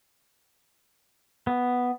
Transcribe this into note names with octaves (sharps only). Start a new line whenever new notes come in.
B3